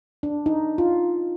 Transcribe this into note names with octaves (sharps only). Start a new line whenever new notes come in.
D4
D#4
F4